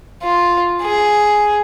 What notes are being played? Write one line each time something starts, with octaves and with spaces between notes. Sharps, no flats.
F4
G#4